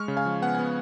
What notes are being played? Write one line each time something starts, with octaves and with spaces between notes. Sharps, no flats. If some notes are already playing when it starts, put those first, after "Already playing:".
Already playing: G#3 C#6 F6
C#3
F5 G#5
F3
B3 F#5
B3 G#5